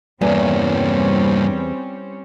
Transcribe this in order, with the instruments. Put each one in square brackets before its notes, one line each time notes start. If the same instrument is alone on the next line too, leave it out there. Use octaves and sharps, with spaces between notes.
[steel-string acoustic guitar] E2 [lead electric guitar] G2 A#3 [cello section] G3 C4 C#4